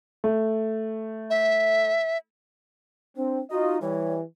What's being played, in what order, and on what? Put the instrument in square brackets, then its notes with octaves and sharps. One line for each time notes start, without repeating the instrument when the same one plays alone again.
[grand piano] A3
[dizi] E5
[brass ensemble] C4 [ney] D4
[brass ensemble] D#4 F4 D#5 [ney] F#4
[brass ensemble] E3 G3 [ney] C#5